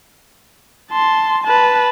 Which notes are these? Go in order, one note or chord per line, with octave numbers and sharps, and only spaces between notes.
A5 C6
B4 A5